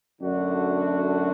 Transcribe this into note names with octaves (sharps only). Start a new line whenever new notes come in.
F#2 D3 A3 D4 F#4